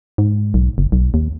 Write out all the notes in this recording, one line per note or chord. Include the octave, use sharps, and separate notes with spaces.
G#2
B1
F#1
B1
D#2